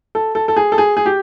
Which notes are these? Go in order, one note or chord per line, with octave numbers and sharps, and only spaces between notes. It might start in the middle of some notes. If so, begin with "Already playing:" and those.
A4
A4
A4
G#4
A4
G#4
G#4
G4